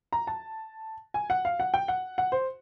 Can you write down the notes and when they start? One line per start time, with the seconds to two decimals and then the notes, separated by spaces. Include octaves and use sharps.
0.13 A#5
0.27 A5
1.14 G#5
1.30 F#5
1.45 F5
1.60 F#5
1.74 G5
1.88 F#5
2.18 F#5
2.32 C5